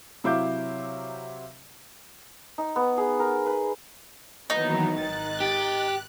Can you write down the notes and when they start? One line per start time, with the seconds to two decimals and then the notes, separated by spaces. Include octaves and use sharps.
0.24 C3 F#3 E4 F5 D6 G6
2.58 D#4
2.76 B3
2.98 G#4
3.20 A#4
3.46 B4
4.50 D#3 E3 F#3 A#3 B3 D#4
4.97 G#1 D#3 F#6 A6
5.40 G4